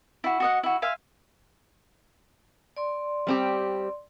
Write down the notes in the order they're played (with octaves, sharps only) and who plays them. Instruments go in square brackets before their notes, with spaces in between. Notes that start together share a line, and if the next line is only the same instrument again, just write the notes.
[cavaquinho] E4 F#4
F#4 D#5 F#5
E4 F#4
E5 F5 G#5 C6
[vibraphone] D5 C6
[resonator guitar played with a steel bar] G3 C4 G4